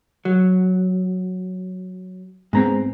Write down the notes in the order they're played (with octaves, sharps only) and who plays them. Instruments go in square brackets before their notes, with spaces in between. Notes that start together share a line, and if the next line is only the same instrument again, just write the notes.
[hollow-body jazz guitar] F#3
[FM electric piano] G#2 B3 C4 [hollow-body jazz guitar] G#3 A#5